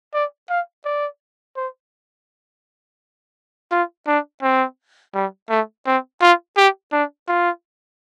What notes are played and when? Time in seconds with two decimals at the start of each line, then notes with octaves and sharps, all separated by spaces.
0.14 D5
0.50 F5
0.85 D5
1.57 C5
3.72 F4
4.08 D4
4.43 C4
5.14 G3
5.50 A3
5.86 C4
6.21 F4
6.57 G4
6.93 D4
7.28 F4